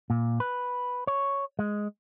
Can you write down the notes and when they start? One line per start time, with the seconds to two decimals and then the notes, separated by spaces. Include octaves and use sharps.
0.10 A#2
0.40 B4
1.07 C#5
1.59 G#3